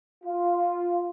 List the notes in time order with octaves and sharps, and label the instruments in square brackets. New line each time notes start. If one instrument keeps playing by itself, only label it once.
[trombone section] F4